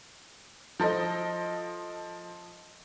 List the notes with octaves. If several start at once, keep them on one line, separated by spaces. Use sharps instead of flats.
F3 A4 D#5